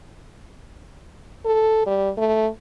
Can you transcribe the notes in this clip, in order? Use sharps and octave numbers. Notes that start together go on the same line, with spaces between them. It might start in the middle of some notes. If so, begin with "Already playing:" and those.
A4
G3
A3